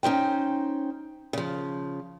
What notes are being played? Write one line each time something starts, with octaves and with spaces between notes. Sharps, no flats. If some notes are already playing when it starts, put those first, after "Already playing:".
C#4 D#4 C5 G5
C#3 F3